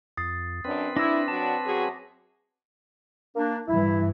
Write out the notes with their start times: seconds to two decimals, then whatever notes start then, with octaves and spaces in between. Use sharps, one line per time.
0.17 F2 D#6 A6 C7
0.65 F#2 C4 D4 B4
0.96 D4 E4 D6 E6 A#6
1.28 F#3 D4 F#4 A5
1.65 F#2 F#4 G#4
3.36 A#3 D4
3.68 G2 E3 E4